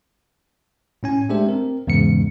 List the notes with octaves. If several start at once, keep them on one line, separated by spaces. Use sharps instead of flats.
A2 C#4 G#5
G#3 A3 D4 G4 C5 E5
C4 A#4
E2 G#2 C#3 G#3 C#7